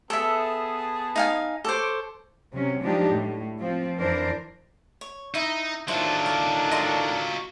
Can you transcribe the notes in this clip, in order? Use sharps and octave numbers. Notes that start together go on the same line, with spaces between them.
B3 G#4 A4 E5 A5
D#4 F5 G#5
A4 C5 C#5 D6
C3 F#3 C#4
F3 F#3 G#3 D4 D#4 G4
A2
F3 C4
F2 E3 D4 A#4 C5
C#5
D#4 E4 D#5 E5
A2 D#3 F#3 D4 E4 F4 C5
D6
D#5 F5 C6